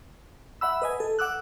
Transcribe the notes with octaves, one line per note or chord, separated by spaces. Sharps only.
E5 F#5 B5 E6
B4 D#5 G#5
A4
F#5 D6 E6 F#6